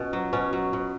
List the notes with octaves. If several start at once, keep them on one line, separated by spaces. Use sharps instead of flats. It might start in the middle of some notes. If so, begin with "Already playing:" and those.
Already playing: B2 C#4
F#3
B2 C#4
F#3
B2